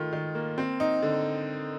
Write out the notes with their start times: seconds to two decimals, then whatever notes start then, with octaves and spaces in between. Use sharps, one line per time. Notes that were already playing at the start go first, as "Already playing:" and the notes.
Already playing: D#3 A3 F4
0.13 D#3
0.35 A#3
0.58 C4
0.80 D#4
1.02 D3